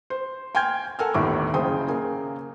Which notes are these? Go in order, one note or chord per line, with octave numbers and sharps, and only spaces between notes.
C5
G5 G#5 C6 F6 G6 G#6
A4 A#4 F#5 G#5 E6 F6
G1 D#2 A2 E5 D6
F#1 C#3 C5 G5 G#5 D#6
C#3 A#3 G#5